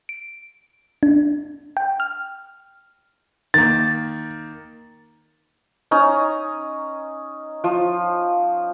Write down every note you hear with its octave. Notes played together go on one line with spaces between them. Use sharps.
D7
D4
G5
F6
D#3 A#3 A6
C#4 D#4 A#5
F3